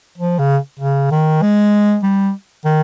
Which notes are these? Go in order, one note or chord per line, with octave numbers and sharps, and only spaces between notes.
F3
C#3
C#3
D#3
G#3
G3
D#3